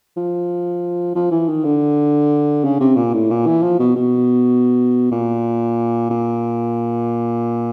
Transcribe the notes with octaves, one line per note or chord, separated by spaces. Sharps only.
F3
F3
E3
D#3
D3
C#3
C3
A#2
A2
A#2
E3
F3
B2
B2
A#2
A#2